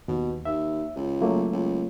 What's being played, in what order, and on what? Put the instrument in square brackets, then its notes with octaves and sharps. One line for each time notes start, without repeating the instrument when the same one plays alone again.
[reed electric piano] D#2 [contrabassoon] B2
[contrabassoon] D#2 [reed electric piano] E5
[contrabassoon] C#2
[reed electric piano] F#3 A3 A#3
[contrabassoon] C#2